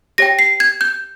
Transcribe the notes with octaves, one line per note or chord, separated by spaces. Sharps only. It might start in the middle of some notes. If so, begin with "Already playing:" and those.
G4 C#5 G5 A#6
C7
G#6
G6